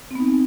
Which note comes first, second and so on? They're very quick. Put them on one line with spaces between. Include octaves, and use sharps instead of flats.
C4 B3 D#4